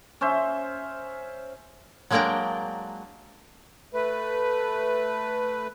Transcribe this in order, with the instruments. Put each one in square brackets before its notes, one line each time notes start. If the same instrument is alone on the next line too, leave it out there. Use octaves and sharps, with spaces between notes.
[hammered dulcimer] C#4 C5 E5
[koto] F#3 G#3 A#3 D4 A#4 G5
[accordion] A3 B4